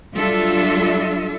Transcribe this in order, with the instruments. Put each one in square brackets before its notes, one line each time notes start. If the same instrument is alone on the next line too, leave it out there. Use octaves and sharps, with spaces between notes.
[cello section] F#3 G3 D4 F4 A4 E5